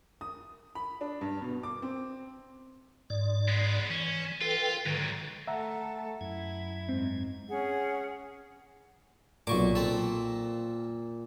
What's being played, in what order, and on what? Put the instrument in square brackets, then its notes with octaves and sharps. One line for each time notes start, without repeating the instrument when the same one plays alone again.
[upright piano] D#6
B5
D4
G2
B2
D6
C4
[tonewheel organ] G#2 D5
[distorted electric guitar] G#3 B3
[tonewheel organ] E3 [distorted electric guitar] C#4
[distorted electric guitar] F4 [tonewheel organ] A4 B4 G5
[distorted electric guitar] G#2 F#3 [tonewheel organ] D3 D#3
[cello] A3 A4 [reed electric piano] E5 F#5 A#5
[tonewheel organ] F#2 G#6 [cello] E4
[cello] G#2 [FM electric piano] C4
[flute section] C#4 G#4 F#5
[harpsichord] B1 C#6 D6 [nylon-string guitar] A#2
[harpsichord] C4 A4